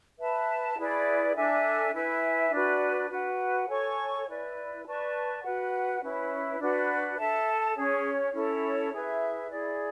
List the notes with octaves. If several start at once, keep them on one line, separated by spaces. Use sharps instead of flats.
B4 E5 A5
E4 G#4 B4 D5
D4 A4 E5 G#5
E4 B4 E5 G#5
D4 F#4 B4 D5
F#4 B4 F#5
A4 C#5 G#5 C#6
E4 B4 D5
B4 D5 A5 C#6
F#4 B4 F#5
C#4 E4 B4
D4 F#4 B4
A4 E5 A5
C#4 G#4 C#5
C#4 E4 A4 C#5
E4 G#4 B4 E5
E4 G#4 D5